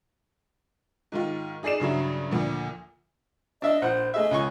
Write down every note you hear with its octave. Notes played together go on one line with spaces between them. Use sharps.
G#2 D#3 F4
D#4 G#4 D5 C7 E7
G2 C#3 F#3 E4
D2 A#2 F3
D4 D#5 E5
A#1 C5 F#5 F#6
A3 G#4 D#5 E5
C#2 G#5 C#6